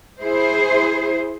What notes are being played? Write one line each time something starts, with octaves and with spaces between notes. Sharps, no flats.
E4 G#4 C5